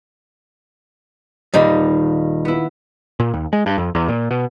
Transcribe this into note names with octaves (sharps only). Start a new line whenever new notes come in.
D#1 D#3 G3 D#4
B3 E4
A#2
D#2
G#3
G2
F2
E2
A#2
B2